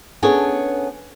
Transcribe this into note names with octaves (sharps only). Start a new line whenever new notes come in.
B3 C#4 D4 G#4 A4 C#5